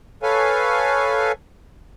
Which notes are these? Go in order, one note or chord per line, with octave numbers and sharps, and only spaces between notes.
A4 B4 C#5 F5 G#5